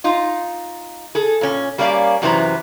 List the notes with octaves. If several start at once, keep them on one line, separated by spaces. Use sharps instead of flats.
D#4 F4
G#4 A4
A#2 C#4
G3 A#3 C#4 A#4 D5 F5
F#2 C3 E3 C4 B4 A#5